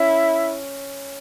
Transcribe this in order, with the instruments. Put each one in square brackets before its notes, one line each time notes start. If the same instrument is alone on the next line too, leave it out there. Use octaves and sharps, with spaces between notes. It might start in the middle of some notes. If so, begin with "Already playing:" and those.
Already playing: [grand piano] C#4 [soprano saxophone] E4